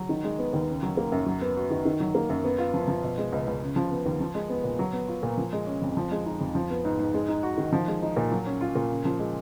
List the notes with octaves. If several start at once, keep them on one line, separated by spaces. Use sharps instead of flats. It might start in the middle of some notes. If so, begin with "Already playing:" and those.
Already playing: F#3
D#3
G#3
B3
D#2
C#3
F#3
A#3
F#2
F#3
B3
F#4
D#3
D#3
F#3
A#3
F#2
B3
F4
F3
F3
B2
G#3
C#2
C#2
C#3
F3
B3
D#2
F3
G#3
B3
A#2
F#3
B3
F4
A#2
F3
G#3
C#4
F2
F3
G#3
D#4
F2
F3
B3
G#2
G#2
G#3
D#4
F#4
D#3
F3
G#3
D#4
A#2
F#3
C#4
F4
A#2
C#3
F3
G#3